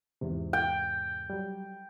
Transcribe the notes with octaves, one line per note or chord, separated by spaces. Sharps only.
E2 G#2 C3
G5
F#3 G3